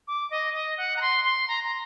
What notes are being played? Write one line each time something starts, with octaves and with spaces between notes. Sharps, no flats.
D6
D#5
D#5
F#5
A#5
C6
C6
A#5
A#5